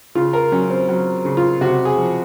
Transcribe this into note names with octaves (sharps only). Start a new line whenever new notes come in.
C#3 F4
A#4
F#3 C#4
C4
F#3
C#3
F4
C3 F#4
G#4
F3